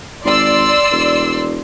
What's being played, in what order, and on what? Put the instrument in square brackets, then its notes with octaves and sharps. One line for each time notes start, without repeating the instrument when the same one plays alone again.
[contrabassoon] G#1 [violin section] D5 C6 E6
[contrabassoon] E1